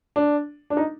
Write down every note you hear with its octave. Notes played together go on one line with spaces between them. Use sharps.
D4
D4
D#4